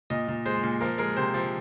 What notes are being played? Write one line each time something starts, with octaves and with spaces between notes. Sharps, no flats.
A#2 D#5
A#2
G#3 C5
A#2
F3 A#4
G#3 A#4
C3 C5
F3